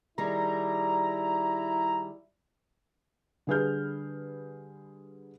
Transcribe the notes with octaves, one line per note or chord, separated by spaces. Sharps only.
D#3 G3 E4 G#4 A#5
D3 G3 G#4 B4 F6 G6